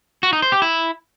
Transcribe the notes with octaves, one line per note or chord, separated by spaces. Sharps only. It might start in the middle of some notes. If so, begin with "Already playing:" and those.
F#4
D#4
C5
G4
E4